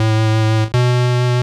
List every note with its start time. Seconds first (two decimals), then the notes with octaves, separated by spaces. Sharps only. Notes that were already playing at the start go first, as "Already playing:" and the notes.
Already playing: A2
0.74 B2